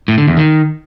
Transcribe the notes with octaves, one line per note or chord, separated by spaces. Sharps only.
A2
D3
E2
D#3